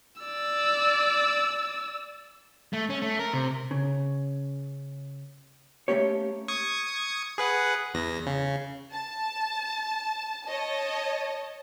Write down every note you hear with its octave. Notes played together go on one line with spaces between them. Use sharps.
D5 E6
A3
C#4
A3
A#4
C3
C#3
A3 A#3 C#4 G4 C#5
C#6 D#6 G#6
G#4 B4 F#5
E2 A#6
C#3
A5
C#5 D#5 A5